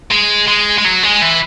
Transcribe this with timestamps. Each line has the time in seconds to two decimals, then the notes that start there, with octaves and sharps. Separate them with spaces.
0.11 G#3
0.48 G#3
0.78 G#3
0.85 F#3
1.03 G#3
1.22 E3